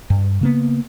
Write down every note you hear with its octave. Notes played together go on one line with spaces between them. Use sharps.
G2
C#3 A#3 B3